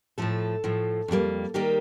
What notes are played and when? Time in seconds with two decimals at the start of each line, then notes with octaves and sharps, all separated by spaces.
0.18 A2 F3 A3 A4
0.64 A2 F3 A3
1.08 F2 D#3 G3 A#3
1.54 D#3 G3 A#3 G4